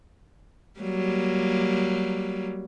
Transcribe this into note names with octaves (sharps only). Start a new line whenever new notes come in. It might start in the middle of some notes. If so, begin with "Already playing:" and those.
F#3 G3 A#3